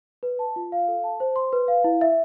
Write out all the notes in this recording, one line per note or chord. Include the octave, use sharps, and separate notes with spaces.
B4
A5
F4
F5
A4
A5
C5
C6
B4
F5
E4
E5